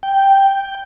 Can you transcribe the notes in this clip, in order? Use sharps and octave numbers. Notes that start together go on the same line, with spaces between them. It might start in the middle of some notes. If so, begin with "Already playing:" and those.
G5